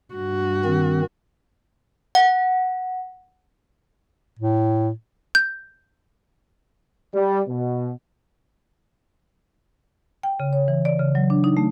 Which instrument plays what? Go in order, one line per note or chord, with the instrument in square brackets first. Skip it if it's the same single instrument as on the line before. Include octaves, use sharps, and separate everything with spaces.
[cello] G2 F#4
[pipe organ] D#3 C4
[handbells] F#5
[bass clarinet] A2
[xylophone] G6
[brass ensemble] G3
B2
[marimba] G5
C#3
C#5
E3
D5
C#3
F#3
D4
D#4
A3